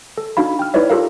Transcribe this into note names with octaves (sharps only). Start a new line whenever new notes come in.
A4
D4 D#4 F#4 F5 B5
G5 F6
D#4 E4 B4 C#5 D5 E5
F4 G4 A4 A#4 F5